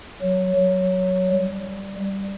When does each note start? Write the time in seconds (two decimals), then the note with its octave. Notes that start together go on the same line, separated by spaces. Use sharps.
0.21 F#3
0.56 F#3
1.29 G3
1.99 G3